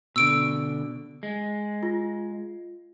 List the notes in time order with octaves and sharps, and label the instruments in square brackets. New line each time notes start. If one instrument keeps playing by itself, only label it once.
[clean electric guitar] B2 D3 [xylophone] E6 D7
[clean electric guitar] G#3
[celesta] F4